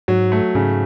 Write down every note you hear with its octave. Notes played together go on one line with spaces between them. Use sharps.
G#2 F#3
A3
G#2 C#3